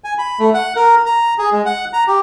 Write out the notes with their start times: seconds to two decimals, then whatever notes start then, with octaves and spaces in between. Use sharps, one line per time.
0.04 G#5
0.18 B5
0.40 A3
0.54 F#5
0.76 A#4
1.06 A#5
1.38 G#4
1.52 G#3
1.65 F#5
1.93 A#5
2.08 G4